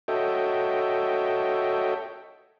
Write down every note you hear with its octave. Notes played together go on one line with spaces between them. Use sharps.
F#4 A4 C#5 D#5 E5 G5